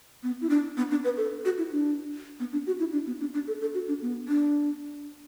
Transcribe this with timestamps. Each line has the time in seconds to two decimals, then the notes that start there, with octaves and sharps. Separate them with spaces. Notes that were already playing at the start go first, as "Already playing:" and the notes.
0.23 B3
0.41 E4
0.50 D4
0.77 B3
0.91 D4
1.04 B4
1.17 A4
1.45 F#4
1.58 E4
1.72 D4
2.40 B3
2.52 D4
2.67 F#4
2.79 E4
2.93 D4
3.07 B3
3.20 D4
3.34 D4
3.47 A4
3.61 A4
3.74 F#4
3.88 D4
4.02 B3
4.28 D4